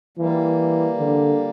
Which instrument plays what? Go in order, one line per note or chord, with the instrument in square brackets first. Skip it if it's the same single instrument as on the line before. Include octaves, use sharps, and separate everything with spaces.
[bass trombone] E3 [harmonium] G3 A#3
[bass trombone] D3